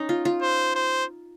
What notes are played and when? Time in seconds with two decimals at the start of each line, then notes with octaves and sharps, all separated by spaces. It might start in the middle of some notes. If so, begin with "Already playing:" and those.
Already playing: C#4 D#4
0.09 F4
0.25 F4
0.42 C5
0.75 C5